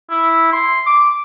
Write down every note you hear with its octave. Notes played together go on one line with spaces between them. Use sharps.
E4
C6
D6